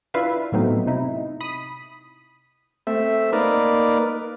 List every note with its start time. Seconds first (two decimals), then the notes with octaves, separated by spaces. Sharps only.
0.14 D4 E4 F4 B4 E5 F5
0.52 A2 F#3 A3 B3 C4 D#4
0.87 C3 D#4 E4
1.41 B5 D#6 B6
2.87 A3 C4 E5
3.33 A#3 D#4 A#4 B4 D5